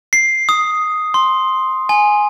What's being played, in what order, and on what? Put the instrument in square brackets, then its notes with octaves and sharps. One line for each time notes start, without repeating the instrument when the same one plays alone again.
[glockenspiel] C7
D#6
C6
G#5